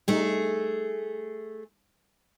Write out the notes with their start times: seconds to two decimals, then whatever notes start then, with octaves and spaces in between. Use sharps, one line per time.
0.08 G3 A3 D#4 G#4